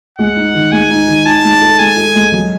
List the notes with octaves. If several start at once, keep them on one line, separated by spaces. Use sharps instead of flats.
G#3 F#5
D#4
D#3
G#3 G#5
D#4
D#3
D#4 A5
G#3
A4
G#3 G#5
A4
G#3
F#3